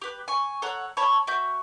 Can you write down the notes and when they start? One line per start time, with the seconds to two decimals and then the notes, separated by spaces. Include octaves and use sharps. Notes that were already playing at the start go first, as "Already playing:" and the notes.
0.02 G4 B4
0.28 G#5 C#6
0.62 A4 C#5 F#5 A#5
0.97 C#5 A5 B5 C#6
1.27 F#4 E5 G6